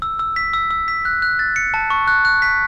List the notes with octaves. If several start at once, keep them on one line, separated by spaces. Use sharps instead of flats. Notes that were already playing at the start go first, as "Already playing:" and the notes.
E6
E6
B6
E6
E6
B6
F#6
F#6
A6
C#7
A5
C#6
F#6
F#6
B6